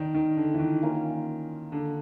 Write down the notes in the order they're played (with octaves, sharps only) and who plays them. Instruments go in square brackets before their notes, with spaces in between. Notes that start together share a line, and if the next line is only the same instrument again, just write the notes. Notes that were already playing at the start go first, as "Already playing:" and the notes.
Already playing: [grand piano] D#3 [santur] B3 D4
[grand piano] D#3
D3
E3
D#3
[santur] A#3 C#4 F4
[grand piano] D3